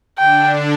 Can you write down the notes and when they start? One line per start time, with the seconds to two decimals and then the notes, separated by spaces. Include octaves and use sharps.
0.19 D3 D4 G5